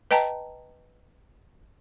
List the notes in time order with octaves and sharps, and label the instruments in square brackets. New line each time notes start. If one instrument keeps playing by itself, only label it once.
[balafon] B4 D#5 G5 A5 A#5